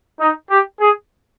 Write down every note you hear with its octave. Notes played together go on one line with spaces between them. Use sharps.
D#4
G4
G#4